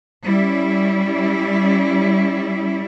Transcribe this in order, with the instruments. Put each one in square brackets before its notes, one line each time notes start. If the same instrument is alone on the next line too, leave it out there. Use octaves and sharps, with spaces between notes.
[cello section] G3 C#4 E4